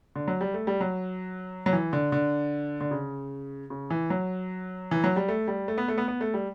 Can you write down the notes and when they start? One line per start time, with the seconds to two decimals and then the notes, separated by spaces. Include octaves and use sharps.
0.16 D3
0.27 F#3
0.41 G3
0.54 A3
0.67 G3
0.81 F#3
1.66 F#3
1.73 E3
1.93 D3
2.12 D3
2.81 D3
2.91 C#3
3.70 C#3
3.90 E3
4.10 F#3
4.91 E3
5.04 F#3
5.16 G3
5.29 A3
5.48 G3
5.68 A3
5.78 B3
5.88 A3
5.98 B3
6.08 B3
6.21 A3
6.34 G3